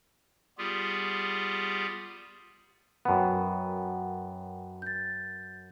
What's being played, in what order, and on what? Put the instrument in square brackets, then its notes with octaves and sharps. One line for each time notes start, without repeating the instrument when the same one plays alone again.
[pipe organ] G3 B3 F4 G4 G#4
[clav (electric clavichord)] F#2 B3 [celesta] F#5 G5
[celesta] G6 A6